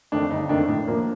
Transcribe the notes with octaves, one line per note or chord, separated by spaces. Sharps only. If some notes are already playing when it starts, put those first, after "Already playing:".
F2 D#3 A3 D4 D#4
G1 D#4
F2 D#3 A3 D4
A2 D4
F3 A#3